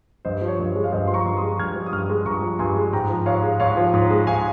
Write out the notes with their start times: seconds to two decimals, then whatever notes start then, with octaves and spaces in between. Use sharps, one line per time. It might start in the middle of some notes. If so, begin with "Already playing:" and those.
0.25 G2 C5 D#5
0.42 F3
0.48 C#5
0.59 G2
0.70 C#5
0.76 G#3
0.84 F5
0.92 G2 C5 D#5
1.07 F3 C6
1.14 A#5 C#6
1.26 G2
1.37 C6 D#6
1.43 G#3
1.60 G2 F6 G#6
1.76 F3
1.86 D#6
1.92 G2 C#6 F6
2.10 G#3
2.26 G2 A#5 C#6
2.42 F3
2.59 G2 G#5 C6
2.76 G#3
2.93 G#2 G5 A#5
3.09 F3
3.26 G#2 C#5 F5
3.43 G#3
3.60 G#2 C#5 F5
3.77 F3
3.94 G#2
4.10 G#3
4.27 G#2 F5 G#5